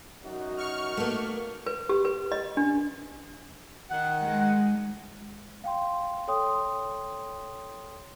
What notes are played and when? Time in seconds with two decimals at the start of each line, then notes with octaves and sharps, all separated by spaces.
0.23 F#2 D#4 F#4
0.57 C#6 F6
0.97 A3 A#3
1.66 B4
1.89 G4
2.05 B4
2.32 D#5
2.57 D4
3.90 D#3 F#5
4.22 G#3
5.64 F5 G5 C6
6.28 A4 C#5 G5 C6 D#6